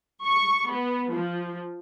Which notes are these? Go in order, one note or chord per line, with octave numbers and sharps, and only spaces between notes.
C#6
B3
F3